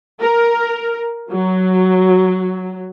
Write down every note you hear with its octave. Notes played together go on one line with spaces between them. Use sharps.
A#4
F#3